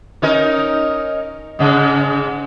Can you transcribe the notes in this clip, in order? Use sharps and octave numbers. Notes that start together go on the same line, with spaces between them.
C#4 D#4 A#4
G#2 C#3